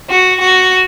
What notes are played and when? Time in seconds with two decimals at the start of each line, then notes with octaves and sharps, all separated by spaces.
0.10 F#4
0.41 F#4